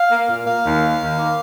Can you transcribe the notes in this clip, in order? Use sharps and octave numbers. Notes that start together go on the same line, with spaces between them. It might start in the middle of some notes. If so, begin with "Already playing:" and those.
Already playing: F5
A#3
A#2
A#3 F5
D#2
D#3
D#2
A#3